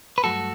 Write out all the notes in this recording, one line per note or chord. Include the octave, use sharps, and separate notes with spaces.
B4
G2 F#3 A3 F#4 A4